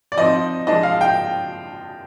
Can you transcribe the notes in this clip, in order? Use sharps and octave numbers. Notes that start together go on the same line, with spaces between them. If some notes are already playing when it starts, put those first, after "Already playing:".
D5
F3 C4 D#4 D#5
F3 G#3 D4 D#5
F5
G5